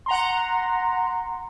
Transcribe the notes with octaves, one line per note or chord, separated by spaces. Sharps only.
F#5 A#5 C6